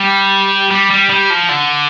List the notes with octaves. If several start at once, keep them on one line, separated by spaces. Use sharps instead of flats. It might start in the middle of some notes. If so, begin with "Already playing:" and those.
Already playing: G3
G3
G3
G3
F3
D3